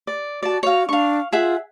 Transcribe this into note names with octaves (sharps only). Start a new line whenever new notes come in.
D5
F#4 D5 A5
F#4 C#5 F5
D4 F5 C#6
F4 G#4 E5 F#5